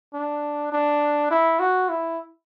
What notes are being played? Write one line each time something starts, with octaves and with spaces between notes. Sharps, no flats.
D4
D4
E4
F#4
E4